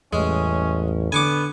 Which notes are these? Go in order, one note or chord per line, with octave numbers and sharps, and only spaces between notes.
A1 E2 E3 G3 G#3 C#4
D3 B3 G#5 C#6 D6